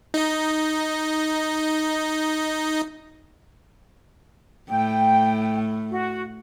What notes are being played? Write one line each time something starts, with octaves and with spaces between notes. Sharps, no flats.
D#4 D#5
A2 G5
F#4